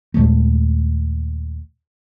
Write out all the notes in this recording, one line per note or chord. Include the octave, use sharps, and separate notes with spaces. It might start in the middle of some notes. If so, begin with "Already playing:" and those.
D#2 A#2 G#3 A3